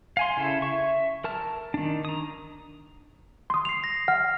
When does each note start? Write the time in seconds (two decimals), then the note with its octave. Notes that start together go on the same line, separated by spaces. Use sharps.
0.17 F5 G#5 C6
0.37 C#3 E4 A4
0.62 E5 C#6
1.24 A#4 A5 E6 F6
1.74 D#3 D4
2.05 A#5 D#6
3.50 C6 D#6
3.65 C7 F7
3.84 A#6
4.08 F#5 F6